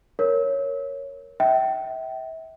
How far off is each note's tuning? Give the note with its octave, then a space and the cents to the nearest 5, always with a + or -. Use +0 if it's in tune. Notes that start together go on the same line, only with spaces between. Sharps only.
A#4 +0 C#5 +0
E5 -30 G5 -30